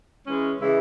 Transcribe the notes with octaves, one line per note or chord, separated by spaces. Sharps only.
E3 G#3 C#4
C#3 E3 G#3 E4